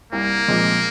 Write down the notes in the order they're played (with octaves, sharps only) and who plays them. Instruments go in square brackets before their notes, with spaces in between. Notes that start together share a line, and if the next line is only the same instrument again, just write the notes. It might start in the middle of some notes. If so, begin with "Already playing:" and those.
[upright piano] C2 [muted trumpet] A#3
[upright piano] A#2 F3 G#3 C4